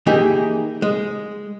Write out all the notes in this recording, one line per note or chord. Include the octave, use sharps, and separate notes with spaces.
E3 A#3 D#4 G4 G#4
G#3